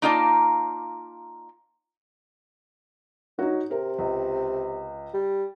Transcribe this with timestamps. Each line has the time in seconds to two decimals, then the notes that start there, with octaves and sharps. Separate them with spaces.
0.02 A#3 D#4 F4 D5 E5 A5
3.39 F#3 D#4 F#4
3.71 C3 A#4
3.98 C#2
5.14 G3